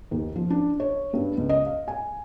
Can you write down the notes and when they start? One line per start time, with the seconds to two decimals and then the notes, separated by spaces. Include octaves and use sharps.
0.11 D#2
0.36 F3
0.50 D4
0.80 C#5
1.13 G2
1.38 C#2
1.49 D#5
1.66 F5
1.88 G#5